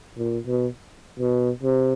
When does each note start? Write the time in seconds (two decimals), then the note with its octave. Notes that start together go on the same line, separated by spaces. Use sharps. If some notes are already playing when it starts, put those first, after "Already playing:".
0.17 A#2
0.47 B2
1.20 B2
1.63 C3